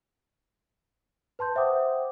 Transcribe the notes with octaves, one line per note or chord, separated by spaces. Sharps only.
B4 A5 C6 G6
C5 E5 F#5 G5 D6 D#6